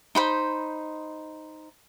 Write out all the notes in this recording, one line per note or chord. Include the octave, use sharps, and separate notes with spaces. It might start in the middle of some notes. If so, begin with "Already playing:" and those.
D#4 C5 B5